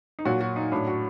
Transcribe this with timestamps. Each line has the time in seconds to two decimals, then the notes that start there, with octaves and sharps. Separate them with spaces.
0.19 D#4
0.25 A#2 F#3 F#4
0.41 F#4
0.56 D#4
0.72 A2 F#3 D4
0.87 F#4